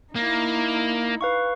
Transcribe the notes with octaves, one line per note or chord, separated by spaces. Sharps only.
A#3 D#4 E4
B4 F5 C#6